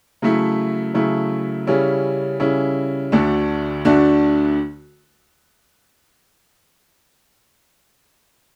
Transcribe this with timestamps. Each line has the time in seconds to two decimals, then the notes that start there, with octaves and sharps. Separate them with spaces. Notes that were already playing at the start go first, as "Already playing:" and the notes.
0.22 C#3 F#3 A3 E4
0.94 C#3 F#3 A3 E4
1.67 C#3 G3 C#4 E4
2.40 C#3 G3 C#4 E4
3.12 D2 D3 A3 D4 F#4
3.85 D2 D3 A3 D4 F#4